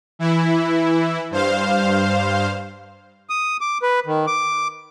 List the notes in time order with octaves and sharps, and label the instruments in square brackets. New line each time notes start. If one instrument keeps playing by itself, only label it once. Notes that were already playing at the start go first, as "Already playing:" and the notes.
[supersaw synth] E3 E4
G2 C5 F5
[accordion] D#6
D6
B4
D#3
D6